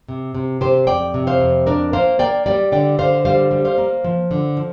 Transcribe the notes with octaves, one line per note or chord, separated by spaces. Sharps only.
C3
C3
C3 G4 C5
F2 D5 G5
C3
C5 F5
F2
D4 A#4 D5
A#3 C5 F5
A#3 D5 G5
G3 D5 G5
D3 D5 G5
D3 C5 F5
G3 C5 F5
G3
C5 F5
A#3
F3
D3
F3